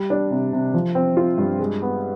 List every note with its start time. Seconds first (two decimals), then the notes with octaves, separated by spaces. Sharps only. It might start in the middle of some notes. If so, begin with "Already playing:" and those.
Already playing: G3
0.10 D4
0.31 C3
0.53 C3
0.74 F3
0.95 C4
1.17 F4
1.38 G2
1.59 G#3
1.82 B3